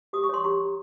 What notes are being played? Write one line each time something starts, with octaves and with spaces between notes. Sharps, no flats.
G4 D#6
C#6
C#5 C6
G4 A#5 C#6
G4